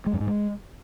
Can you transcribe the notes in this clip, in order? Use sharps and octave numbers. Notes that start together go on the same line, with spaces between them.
G#3
F#2
G#2
G#3